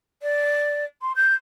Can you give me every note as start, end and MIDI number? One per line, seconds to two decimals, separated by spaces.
0.22 0.84 74
1.01 1.12 84
1.15 1.34 91